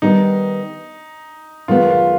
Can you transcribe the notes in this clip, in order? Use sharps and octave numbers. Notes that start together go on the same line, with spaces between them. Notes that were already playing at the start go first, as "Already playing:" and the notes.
D#3 G3 B3 D#4
F#2 D#3 G#3 B3 F4
F4